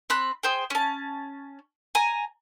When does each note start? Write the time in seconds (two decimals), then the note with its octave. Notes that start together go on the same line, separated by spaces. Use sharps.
0.10 C4 B5 F#6
0.43 G#4 C5 G5
0.70 C#4 A5
1.95 G#5 A#5